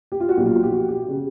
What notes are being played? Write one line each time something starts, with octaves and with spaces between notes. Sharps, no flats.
G4
F4
F#4
B1 A#2 F3 G4
F4
F#4
G4
F#4
G4
C#3